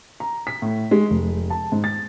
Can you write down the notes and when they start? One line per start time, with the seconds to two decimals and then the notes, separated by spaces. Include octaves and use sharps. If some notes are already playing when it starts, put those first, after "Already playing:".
0.20 A#5
0.47 B6
0.62 A2
0.91 G#3
1.10 F1
1.50 A5
1.72 G#2
1.84 A6